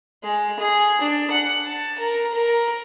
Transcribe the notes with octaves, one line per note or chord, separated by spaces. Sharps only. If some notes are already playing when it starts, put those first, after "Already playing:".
G#3
G#4
D4
F#5
A5
A#4
A#4